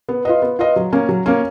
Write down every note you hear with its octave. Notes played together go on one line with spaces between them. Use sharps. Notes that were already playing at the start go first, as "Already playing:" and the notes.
B3
F4 B4 D#5
B3
F4 B4 D#5
F#3
A#3 C#4
F#3
A#3 C#4